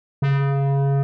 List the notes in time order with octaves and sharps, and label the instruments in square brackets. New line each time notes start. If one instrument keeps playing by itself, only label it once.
[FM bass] C#3